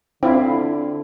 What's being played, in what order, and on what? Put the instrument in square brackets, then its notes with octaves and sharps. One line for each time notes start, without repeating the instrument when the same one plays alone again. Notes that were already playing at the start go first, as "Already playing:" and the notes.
[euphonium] D3 [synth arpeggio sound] C4 [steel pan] E4 F4